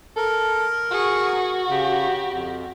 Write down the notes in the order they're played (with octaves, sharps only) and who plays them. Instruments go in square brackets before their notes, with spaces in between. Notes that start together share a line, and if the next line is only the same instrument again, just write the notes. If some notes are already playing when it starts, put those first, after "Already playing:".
[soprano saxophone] A4 [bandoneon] A#4
[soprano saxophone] F#4 [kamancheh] G#4 C#6
[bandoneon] C#3 [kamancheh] G4
[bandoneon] F2